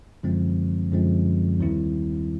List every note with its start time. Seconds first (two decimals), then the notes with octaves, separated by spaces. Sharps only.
0.23 F#2 D3 F3 G#3 C4
0.91 F#2 D3 F3 G#3 C4
1.60 D#2 D#3 G3 C4 E4